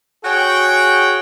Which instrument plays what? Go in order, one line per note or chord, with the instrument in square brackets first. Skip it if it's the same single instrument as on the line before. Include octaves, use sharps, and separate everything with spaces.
[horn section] F#4 G#4 C#5 F#5 G5